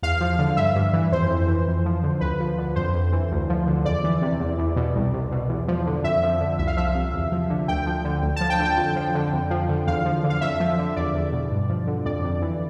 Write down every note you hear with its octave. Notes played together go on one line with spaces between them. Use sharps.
E2 F5
F3
D3
G2 E5
G2
E3
F2 C5
F2
E3
F2
F3
D3
D2 B4
F3
D3
F2 C5
F2
E3
D2
F3
D3
E2 D5
E3
C3
E2
E2
B2
C2
C2
B2
E2
F3
D3
F2 E5
F3
D3
C2 E5
F5
F3 E5
C3
E2
F3
D3
D2 G5
F3
D3
D2
F3 A5
G5
D3
G5
F2
F3
D3
F2
F3
D3
E2 F5
F3
D3
F5
F2 E5
F3
D3
E2 D5
E2
B2
G2
F3
D3
F2 D5
F2
E3